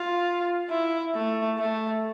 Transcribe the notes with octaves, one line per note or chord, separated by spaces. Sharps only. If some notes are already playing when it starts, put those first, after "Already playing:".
Already playing: F4
E4
A3
A3